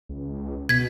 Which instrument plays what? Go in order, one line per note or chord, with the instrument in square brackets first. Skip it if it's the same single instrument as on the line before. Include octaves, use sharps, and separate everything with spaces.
[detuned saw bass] C#2
[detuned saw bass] B2 [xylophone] G#6 B6